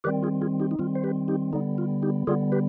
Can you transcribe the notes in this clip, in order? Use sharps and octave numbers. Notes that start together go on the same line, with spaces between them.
D#3 G3 C4 G4 B4
F4 G#4
F4 G#4
D#4 G4
D#4
D#3 G3 C4 F4
C5
G4 B4
D#4 G4
D3 G3 B3 D#4
F4
D#4 G4
D3 G3 B3 F4 G#4
G4 B4